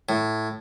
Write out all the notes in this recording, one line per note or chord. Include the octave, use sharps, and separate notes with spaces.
A2